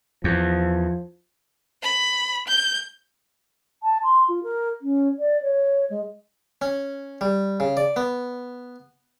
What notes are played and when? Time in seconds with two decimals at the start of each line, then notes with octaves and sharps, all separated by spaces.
0.24 E2 F3
1.82 B5
2.48 G6
3.82 A5
4.03 C6
4.28 F4
4.42 A#4
4.81 C#4
5.18 D5
5.42 C#5
5.89 G#3
6.62 C#4
7.21 G3
7.60 C#3
7.77 D5
7.96 B3